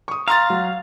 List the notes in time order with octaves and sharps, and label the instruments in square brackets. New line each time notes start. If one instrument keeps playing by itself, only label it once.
[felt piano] C#6 D#6
[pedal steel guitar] F5 [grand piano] A#5 C6 A6
[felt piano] F#3